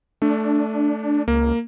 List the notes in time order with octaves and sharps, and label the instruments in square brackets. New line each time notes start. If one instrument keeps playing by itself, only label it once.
[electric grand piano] A3 [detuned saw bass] D4
[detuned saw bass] C#2 [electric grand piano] A#3